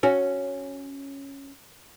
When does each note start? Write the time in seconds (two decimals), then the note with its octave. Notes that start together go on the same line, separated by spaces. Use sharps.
0.03 C#4 F#4